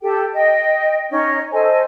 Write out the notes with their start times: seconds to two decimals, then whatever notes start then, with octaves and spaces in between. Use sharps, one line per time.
0.01 G4 A4 G5
0.34 D#5 G5
1.10 C#4 D#4 C#5 D#5
1.52 A4 C5 D#5 G#5